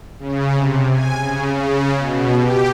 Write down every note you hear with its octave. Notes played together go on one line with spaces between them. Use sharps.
C#3
C3
G#5
C#3
C#3
B2
G4